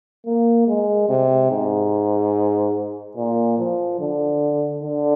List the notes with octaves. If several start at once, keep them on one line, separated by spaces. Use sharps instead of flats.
A#3
G#3
C3
G#2
A#2
F3
D3
D3